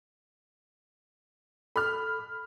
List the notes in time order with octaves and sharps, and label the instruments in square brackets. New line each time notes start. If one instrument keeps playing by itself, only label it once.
[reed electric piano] A4 [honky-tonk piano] B5 F6